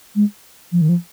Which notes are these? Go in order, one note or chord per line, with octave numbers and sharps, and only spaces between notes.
G#3
F3
D#3
F3